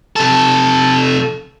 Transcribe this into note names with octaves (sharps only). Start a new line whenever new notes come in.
C3 A4